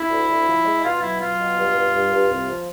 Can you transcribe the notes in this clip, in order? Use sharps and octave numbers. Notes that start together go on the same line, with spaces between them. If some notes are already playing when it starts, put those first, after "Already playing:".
Already playing: E4
D2
D2
F3
G#3
B2 F4
F#3 E4
F#3 F4
B2
G2
G2
G2
G2
C2
F3